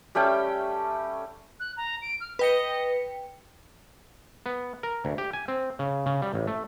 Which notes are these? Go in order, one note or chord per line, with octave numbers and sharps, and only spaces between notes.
G3 A3 C#4 G5
F#6
A#5
D7
F6
B4 D#5 G5 C#7
B3
A#4
D2
G4
G#5
C4
C#3
C#3
G3
A1
A3